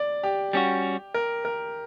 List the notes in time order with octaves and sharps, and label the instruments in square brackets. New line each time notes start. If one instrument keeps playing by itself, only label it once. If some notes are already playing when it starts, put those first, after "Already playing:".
Already playing: [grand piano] D5
G4
[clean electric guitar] G3 C#4 F#4
[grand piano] A#4
A#4